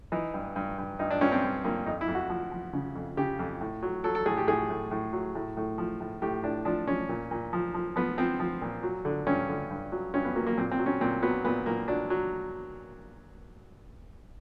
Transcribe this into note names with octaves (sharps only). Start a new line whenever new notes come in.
E3 D#4
G2
G2
G2
G2 D#4
D4
G2 C#4
C4
G2
G2 A#3
F2 D#4
E4
F2
F#4
F3
F3
C#3
F2
C#3 G4
F2
A2
F#3
F#3 A4
A4
A2 G#4
G4
A2 G#4
A2
A2
F#3
A2
A2
F3
A2
A2 G4
A2 D4
F3 D4
F3 C#4
A#2
A#2
F3
F3
F3 B3
F3 C4
F3
A#2
F#3
D3
G2 C#4
D3
G2
F#3
G2 C#4
B3
F#3 A#3
A#3
A#2 C4
C4
F#3
C#4
A#2 C4
F#3 B3
A#2 B3
A#2 A#3
F#3 D4
F#3